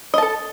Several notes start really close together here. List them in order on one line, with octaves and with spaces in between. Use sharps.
D#5 A5 A4